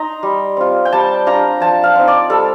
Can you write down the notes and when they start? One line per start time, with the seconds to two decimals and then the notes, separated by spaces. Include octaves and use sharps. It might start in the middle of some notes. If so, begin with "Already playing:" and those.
Already playing: D#4 A#5 C6
0.23 G3
0.57 C4 F4
0.85 G5
0.92 G3 A5
1.26 D4 F4 A#5
1.60 F3 A5
1.83 F5
1.96 C4 D#4
2.08 D5
2.29 G3 A4